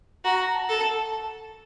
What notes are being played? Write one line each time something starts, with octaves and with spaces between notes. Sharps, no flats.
F#4 A#5
A#5
A5
A4